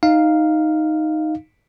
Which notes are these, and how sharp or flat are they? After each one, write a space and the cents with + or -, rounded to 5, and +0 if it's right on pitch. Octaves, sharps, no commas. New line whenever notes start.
D#4 +0 F5 +0